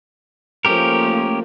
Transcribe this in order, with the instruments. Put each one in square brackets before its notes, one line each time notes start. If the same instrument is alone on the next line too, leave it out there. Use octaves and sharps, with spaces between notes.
[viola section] F3 A3 A#3 [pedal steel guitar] C#4 G4 A#4